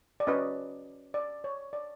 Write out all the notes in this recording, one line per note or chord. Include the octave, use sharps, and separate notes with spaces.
D5
C#4 F#4 B4 D#5
D5
C#5
D5